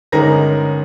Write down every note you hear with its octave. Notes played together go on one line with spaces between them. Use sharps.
G1 G#3 C#4 D#4 A#4 A#6